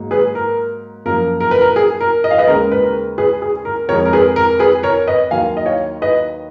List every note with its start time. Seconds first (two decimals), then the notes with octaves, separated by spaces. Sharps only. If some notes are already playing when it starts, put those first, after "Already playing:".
Already playing: G#2 F#3 A#3
0.11 G#4 B4
0.35 A#4
1.05 F#2 F3 A#3 A#4
1.40 A#4
1.51 B4
1.61 A#4
1.76 G#4
2.01 A#4
2.24 D#5
2.31 F5
2.38 B4 D#5
2.47 D#2 C#3 G#3 A#4
2.72 B4
2.83 A#4
3.18 G#4 B4
3.42 G#4
3.65 A#4
3.89 F2 F3 G#3 A#4 C#5
4.06 A#4
4.13 G#4 B4
4.36 A#4
4.59 G#4 B4
4.83 A#4 C#5
5.07 B4 D#5
5.31 D#2 D#3 F#3 A#3 F5 G#5
5.57 D#5
5.66 C#5 F5
6.02 B4 D#5